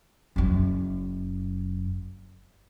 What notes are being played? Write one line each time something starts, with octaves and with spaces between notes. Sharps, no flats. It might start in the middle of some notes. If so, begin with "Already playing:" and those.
F#1 F#2